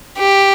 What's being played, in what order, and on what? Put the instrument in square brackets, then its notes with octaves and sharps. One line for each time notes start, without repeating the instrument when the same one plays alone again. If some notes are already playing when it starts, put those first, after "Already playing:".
[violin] G4